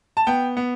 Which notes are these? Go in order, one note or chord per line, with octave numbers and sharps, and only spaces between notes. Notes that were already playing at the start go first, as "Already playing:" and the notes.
A5
B3 G5
B3